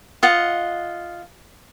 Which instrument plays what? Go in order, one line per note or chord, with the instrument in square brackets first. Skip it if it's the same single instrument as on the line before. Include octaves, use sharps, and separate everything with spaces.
[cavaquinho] F4 D#5 F#5